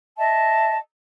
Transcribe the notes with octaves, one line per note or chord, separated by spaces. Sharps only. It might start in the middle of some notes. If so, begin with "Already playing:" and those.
D#5 E5 A5